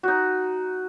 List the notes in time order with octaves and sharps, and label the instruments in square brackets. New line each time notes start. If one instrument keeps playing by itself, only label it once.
[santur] D#4 F#4